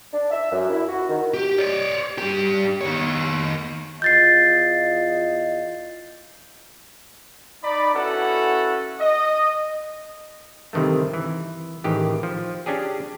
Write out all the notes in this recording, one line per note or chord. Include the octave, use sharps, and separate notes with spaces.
D4
E5
F#2
E4
F#4
D#3
G4
C#5 D5
G2 G4
D#3 C#5
E2 F4 D#5 G6 A6 C7
D#4 D5 B5
C#4 E4 F#4 A4 B4 F#5
D#5
G2 C3 D#3 E3 A3
E3
A1 D#3 E3 G4 G#4
F3
C#4 D4 G4 G#4